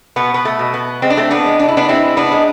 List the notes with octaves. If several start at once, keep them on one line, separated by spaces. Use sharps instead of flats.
B2 B3
B3
A3
B2
B3
G#3 C4
D4
A3 C4
B3 D4
G#3
D4
E4
B3 D4
G#3 C4 E4
B3 D4
G#3